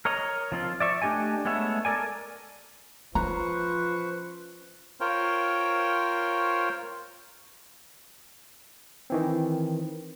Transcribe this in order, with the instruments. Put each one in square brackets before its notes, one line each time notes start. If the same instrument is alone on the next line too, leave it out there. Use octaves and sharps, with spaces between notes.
[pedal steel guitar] A#4 C#5 D#5 A#5
F3 C4 F4
D5 E5 C#6
A3 D4 G4 D#5 G#5
G#3 A3 B3 C#5 E5
A4 A#4 D5 G#5
[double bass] F3 [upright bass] C#4 [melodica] B4 C5 C#6 [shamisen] A#5
[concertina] F4 A#4 C5 C#5 G5
[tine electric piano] D#3 E3 C4